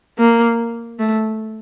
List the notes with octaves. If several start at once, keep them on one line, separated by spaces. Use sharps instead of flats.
A#3
A3